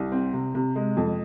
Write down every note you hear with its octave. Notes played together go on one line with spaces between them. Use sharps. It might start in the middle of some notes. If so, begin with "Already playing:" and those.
Already playing: C2
C4
C3
C3
G#3
F2